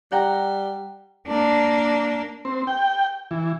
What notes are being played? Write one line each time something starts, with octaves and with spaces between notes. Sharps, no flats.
G3 F#5 G5 A#5
A#3 D4
C4
G5
E3